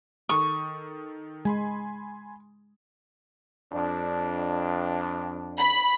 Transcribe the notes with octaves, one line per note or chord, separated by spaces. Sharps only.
D#3 A4 C#6 D#6
G#3 G#5 B5 C6
F2 D4
B5